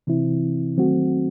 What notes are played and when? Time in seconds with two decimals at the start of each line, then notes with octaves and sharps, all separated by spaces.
0.07 C3 E3 C4 E4
0.77 D#3 F#3 A3 C4 F#4